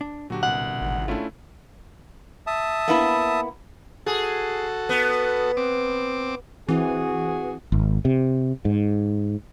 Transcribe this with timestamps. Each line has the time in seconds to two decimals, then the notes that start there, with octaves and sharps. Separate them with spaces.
0.01 D4
0.30 A#2 D3 F#3 F#4 G4
0.43 C2 B2 F#5
0.81 G#1
1.08 A3 C#4 D4 E4 F4
2.47 E5 A5 D#6
2.88 A#3 B3 E4
4.06 F#4 G#4 A4
4.89 B3
5.57 C4 D6
6.69 E3 C4 E4 F#4 G#4
7.72 G#1
8.05 C3
8.65 G#2